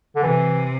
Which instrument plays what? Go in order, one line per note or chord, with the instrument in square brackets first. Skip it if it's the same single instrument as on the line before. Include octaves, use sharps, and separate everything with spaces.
[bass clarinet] D3
[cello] C3 [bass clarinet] E3